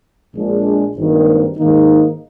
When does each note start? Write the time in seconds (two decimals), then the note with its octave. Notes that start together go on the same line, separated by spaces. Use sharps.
0.35 A#1 A#2 G#3 D4
0.97 G#1 G2 D#3 A#3
1.58 G#2 D#3 A#3 D#4